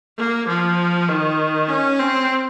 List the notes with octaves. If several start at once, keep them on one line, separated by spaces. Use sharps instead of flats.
A#3
F3
D#3
C#4
C4